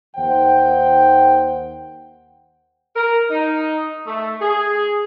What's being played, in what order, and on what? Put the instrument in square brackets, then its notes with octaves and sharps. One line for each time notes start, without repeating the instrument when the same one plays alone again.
[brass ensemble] D#2 D#3 C5 F#5 G5
[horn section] A#4
D#4
A3
G#4